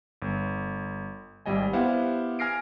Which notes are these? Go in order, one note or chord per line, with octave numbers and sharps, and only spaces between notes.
G1
G#1 G3 D#5 G#5
B3 E4 G4 C5 F5 F#5
G#5 F6 A#6 C7 D7